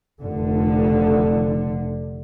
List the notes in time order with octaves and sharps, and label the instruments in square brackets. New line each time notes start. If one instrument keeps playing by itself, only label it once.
[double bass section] F1 D3